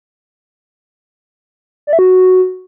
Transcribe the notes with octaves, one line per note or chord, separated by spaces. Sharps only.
D5
E5
F#4